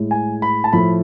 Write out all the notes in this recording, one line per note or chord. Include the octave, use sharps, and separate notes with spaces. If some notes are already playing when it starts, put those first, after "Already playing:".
Already playing: A2 G#3
G#5
B5
A5
A2 F3 A3 B5